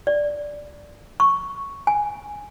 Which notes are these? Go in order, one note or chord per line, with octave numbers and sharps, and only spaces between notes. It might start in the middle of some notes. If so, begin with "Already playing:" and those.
D5
C#6
G#5